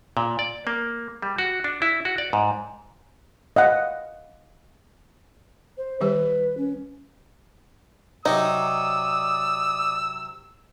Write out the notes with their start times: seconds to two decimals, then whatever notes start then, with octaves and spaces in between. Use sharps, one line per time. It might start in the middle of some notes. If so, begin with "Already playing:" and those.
0.17 A#2
0.39 D5
0.67 A#3
1.22 G3
1.39 F#4
1.64 D4
1.82 E4
2.05 F#4
2.18 D5
2.33 G#2
3.56 D#5 F5 F#5
5.78 C5
6.01 D#3 G3 G4 B4
6.57 C#4
8.26 C3 F#3 D#4 D5 D#6 E6